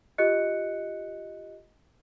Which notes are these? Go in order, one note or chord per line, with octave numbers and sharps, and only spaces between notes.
F4 G4 A4 D#5 F#6 C#7